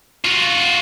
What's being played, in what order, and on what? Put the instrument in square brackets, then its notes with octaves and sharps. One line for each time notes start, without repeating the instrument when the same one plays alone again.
[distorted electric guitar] F4 F#4